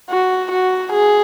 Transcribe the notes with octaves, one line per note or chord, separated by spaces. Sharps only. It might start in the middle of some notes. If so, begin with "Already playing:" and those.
F#4
F#4
G#4